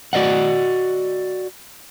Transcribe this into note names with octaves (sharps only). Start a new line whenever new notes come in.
F#4 D5 D#5 F#5